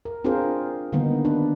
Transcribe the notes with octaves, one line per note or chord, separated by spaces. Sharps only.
A#4
C4 D4 F4 G#4 A#4 C5
D3 D#3 G3 A#3 B3 D#4
D4 B4